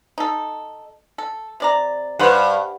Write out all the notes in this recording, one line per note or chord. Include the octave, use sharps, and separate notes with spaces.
D#4 A4
A4
C3 D5 A#5
G2 B4 C5 F#5